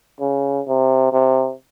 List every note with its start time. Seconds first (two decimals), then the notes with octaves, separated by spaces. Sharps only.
0.20 C#3
0.67 C3
1.13 C3